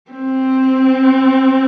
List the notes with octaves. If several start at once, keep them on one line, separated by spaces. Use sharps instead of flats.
C4